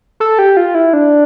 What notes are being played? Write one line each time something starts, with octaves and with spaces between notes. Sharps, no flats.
A4
G4
F4
E4
D4